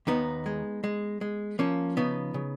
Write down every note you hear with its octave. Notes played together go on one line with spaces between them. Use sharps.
D#2 B3 D#4
G#3
G#3
G#3
F3 A#3 C#4
C#3 B3 D#4
C#3